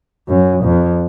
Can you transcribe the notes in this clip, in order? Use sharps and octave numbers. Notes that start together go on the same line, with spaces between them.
F#2
F2